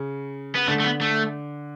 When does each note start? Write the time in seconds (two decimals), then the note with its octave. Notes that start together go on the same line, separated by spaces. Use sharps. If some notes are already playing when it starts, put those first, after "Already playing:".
Already playing: C#3
0.55 B3
0.67 D3 A3
0.80 A3
0.84 B3
1.01 A3